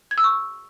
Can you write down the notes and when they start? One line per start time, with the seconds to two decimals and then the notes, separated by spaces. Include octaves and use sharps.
0.11 G#6
0.18 E6
0.24 C#6